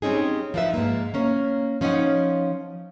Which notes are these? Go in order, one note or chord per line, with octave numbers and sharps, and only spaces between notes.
G3 C4 C#4 D#4 G#4
F3 D#4 F4 B4 E5
G#2 A#3
A#3 C#4
F3 C#4 D#4 F4 F#5